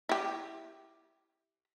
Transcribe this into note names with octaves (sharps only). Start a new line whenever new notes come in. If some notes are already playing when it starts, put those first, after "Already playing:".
E4 G4